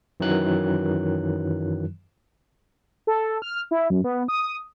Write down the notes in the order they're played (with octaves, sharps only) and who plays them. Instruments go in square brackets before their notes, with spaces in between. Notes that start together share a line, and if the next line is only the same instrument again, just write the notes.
[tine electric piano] F#2 D#3 E3 F#3 F#6
[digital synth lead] A4
F6
E4
F#2
B3
D#6